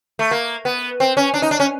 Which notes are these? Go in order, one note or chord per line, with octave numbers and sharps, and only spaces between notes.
A3
A#3
B3
C4
C#4
D4
D#4
D4
C#4